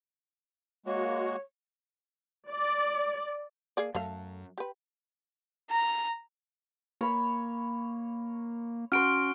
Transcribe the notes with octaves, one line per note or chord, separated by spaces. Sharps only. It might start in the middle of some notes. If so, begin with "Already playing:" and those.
G#3 A#3 F#4 C#5
D5
A#3 G#4 D5
F#2 F#3 A3 A4 F5
G4 B4
A#5
A#3 C#5 B5
C#4 F#4 C6 F6 D7